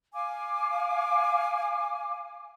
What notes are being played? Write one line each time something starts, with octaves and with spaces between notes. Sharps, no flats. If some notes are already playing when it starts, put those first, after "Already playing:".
F5 G#5 D6